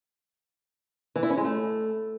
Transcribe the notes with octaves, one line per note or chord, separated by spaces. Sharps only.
E3
E4
C#4
G#3
A3